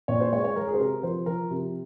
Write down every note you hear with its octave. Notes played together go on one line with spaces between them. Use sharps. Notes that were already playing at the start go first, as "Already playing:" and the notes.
A#2 C#5
C5
G#3 C#5
C#5
G#3 A#4
G#4
C5
C3 A#4
F3 C5
F3 A#4
C3